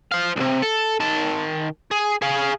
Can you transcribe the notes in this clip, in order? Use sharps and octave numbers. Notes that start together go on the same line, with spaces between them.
C5 F5
B1 C3
A4
D#3 A5
G#4
G#4 F5